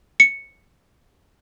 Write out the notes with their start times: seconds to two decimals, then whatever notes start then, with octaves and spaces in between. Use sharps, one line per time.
0.20 C#7